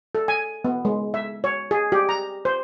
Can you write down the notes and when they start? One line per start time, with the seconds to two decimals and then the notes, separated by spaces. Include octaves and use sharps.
0.15 A4
0.28 G#5
0.65 B3
0.85 G#3
1.14 E5
1.44 C#5
1.71 G#4
1.92 G4
2.09 A#5
2.45 C5